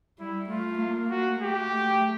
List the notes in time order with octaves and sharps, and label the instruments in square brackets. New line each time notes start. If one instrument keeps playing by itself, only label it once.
[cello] G3 [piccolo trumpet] E4
[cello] A3 [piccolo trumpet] F4
[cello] A#3
[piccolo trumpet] F#4
[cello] A3 [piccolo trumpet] G4
[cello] A3